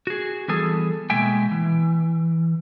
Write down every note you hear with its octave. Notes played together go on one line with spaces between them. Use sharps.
F#4 G#4
E3 G3 B3 G#4 A4
B2 G#3 A#3 E5 G5 G#5
E3